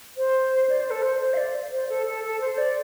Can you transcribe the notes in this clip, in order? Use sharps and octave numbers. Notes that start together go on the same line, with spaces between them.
C5
D5
C5
A4
C5
C5
F5
D5
C5
A4
A4
A4
C5
D5